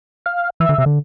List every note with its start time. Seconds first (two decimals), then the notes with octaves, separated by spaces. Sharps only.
0.26 F5
0.60 E3 E5
0.69 D3
0.78 C3
0.86 D3